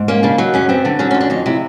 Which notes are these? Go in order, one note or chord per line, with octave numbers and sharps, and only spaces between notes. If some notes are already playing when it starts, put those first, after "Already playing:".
Already playing: G#2
A#3 C#4
C#3 D4
F#3 D#4
F#2 C#4
B3 C4
D3
F#3 C#4
F2 C#4
D4
F2 D#4
C3 E4